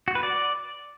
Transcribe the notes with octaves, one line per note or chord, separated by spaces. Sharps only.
F#4
B4
D5